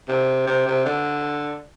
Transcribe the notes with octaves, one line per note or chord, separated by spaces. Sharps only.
C3
C3
C3
D3